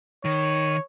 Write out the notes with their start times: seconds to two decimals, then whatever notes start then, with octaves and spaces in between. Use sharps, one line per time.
0.25 D#3 C#5